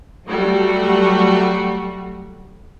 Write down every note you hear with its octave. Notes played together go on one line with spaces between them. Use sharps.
F#3 G3 A3 F#4